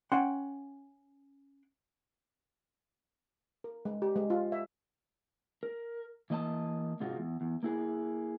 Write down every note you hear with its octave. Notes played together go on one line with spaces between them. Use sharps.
C#4 F#5 G5 C6
A#4
G#3
G4
G#3
F4
E5
A#4
E3 A#3 D#5 G5 A5
G#2 C3 G#3 F4 F#4
E2
E2
A#3 E4 G#4